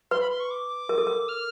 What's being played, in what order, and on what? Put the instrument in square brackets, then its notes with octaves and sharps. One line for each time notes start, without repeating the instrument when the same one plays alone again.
[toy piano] B4 [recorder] C6
[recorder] B5
C6
C#6
D6
[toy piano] A#4
A4
A#4
[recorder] F6